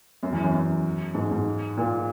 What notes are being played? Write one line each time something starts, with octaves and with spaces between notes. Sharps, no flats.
F#2
E2
F#2
F#2
G#2
G#2
A#2